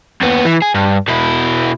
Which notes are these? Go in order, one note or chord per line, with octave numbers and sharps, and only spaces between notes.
D#2 B3
E3
G#4
G2
B2 E4